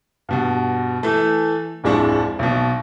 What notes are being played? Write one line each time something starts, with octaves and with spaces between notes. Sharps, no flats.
G2 B2 F#4
E3 A3
D1 F2 G#3 D4 E4 C#6
B1 B2